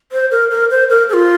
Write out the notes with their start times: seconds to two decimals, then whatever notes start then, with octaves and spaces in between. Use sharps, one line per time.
0.12 C5
0.31 A#4
0.51 A#4
0.71 C5
0.90 A#4
1.09 A4
1.13 F4